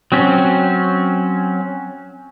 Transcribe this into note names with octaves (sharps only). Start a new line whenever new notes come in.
F#3 C4 C#4